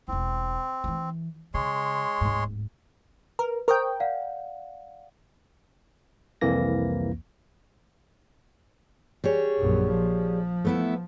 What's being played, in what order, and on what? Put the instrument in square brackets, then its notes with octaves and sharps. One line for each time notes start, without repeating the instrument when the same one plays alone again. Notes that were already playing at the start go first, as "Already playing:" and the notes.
[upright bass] E1 E4 [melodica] C4
[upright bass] E3 F3
[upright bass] C#3 [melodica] G#3 C#5 C6
[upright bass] D1 G#2
[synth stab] A#4 [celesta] B4
[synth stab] A#4 G5 [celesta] C5 C#6 D#6
[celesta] D5 F5 F#5
[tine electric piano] C2 F2 E3 A#3 A#6
[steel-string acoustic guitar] G3 G#4 C#5
[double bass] A#1 F#2
F3
[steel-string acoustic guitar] A3 B3 E4